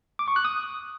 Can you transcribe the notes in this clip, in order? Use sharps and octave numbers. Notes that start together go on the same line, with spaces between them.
D6
C#6
F#6
D#6